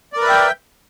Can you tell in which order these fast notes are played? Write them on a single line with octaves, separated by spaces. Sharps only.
D5 A#4 B4 E5 G5